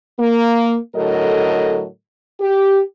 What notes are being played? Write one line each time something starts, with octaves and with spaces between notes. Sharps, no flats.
A#3
A2 D3 F#3 A4 A#4 D#5
G4